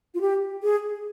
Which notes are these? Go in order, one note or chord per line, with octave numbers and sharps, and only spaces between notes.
F4
G4
G#4